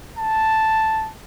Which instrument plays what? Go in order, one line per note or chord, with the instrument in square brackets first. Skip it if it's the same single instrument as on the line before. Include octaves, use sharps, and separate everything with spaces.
[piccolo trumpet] A5